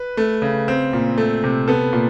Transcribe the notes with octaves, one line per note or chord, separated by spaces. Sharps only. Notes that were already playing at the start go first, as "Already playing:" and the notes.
Already playing: B4
A3
C#3
C4
A#2
A3
C3
B3 A4
A#2